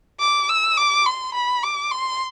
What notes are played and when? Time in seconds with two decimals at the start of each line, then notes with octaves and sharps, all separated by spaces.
0.20 D6
0.49 E6
0.77 D6
1.06 C6
1.34 B5
1.63 D6
1.91 C6